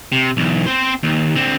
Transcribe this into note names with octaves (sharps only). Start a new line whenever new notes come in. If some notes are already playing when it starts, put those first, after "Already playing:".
C3
B1 E2
C4 C5
D#2
D3 C4